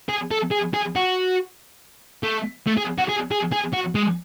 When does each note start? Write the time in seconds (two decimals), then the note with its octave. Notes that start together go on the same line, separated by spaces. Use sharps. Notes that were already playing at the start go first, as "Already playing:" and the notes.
0.09 G#4
0.31 A4
0.52 G#4
0.74 G#4
0.96 F#4
2.23 A3
2.67 A3
2.78 G#4
2.98 F#4
3.09 G#4
3.31 G#4
3.52 G#4
3.73 F#4
3.95 G#3